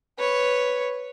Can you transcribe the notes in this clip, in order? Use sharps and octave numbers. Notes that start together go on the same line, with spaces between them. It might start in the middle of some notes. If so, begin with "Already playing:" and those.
B4 C#5